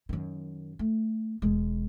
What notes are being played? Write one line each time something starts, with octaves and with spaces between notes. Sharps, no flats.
F#2 D#3
A3
E1 G#3